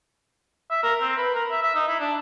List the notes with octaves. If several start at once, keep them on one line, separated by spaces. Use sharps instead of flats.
E5
A#4
C4
B4
A#4
E5
E5
D#4
E4
D4